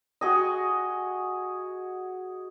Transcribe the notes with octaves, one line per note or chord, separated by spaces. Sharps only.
F#4 G#4 D#5